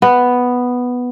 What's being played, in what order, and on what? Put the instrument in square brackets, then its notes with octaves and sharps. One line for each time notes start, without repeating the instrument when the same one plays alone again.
[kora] B3